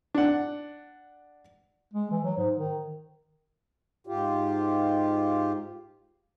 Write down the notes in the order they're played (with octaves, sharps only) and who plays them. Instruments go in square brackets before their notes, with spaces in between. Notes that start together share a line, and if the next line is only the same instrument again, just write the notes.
[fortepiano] D4 F#5
[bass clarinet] G#3
E3
F#3
G#2
D#3
[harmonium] G#2 F4 G4